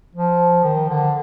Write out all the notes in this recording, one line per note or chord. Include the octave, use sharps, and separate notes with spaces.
F3
D#3
D3